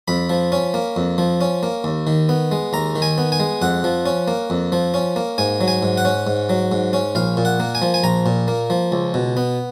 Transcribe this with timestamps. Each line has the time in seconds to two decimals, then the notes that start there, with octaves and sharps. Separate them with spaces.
0.08 F2 B5
0.29 F3
0.52 C#4
0.74 A#3
0.96 F2
1.18 F3
1.41 C#4
1.63 A#3
1.84 D#2
2.07 D#3
2.29 B3
2.52 G#3
2.73 D#2 A#5
2.96 D#3
3.02 G#5
3.18 B3
3.32 G#5
3.40 G#3
3.62 F2 F#5
3.84 F3
4.06 C#4
4.28 A#3
4.50 F2
4.72 F3
4.94 C#4
5.16 A#3
5.38 G#2 G#5
5.61 F#3
5.68 G#5
5.83 G#2
5.97 F#5
6.05 C#4
6.27 G#2
6.49 F#3
6.72 G#2
6.93 C#4
7.15 A#1 F5
7.37 A#2
7.45 F#5
7.60 A#3
7.75 G#5
7.82 F3
7.94 G#5
8.03 A#1 A#5
8.26 A#2
8.48 A#3
8.70 F3
8.92 C#2
9.14 B2
9.37 B3